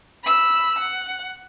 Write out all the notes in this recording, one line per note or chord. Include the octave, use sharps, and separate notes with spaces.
B5 E6
F#5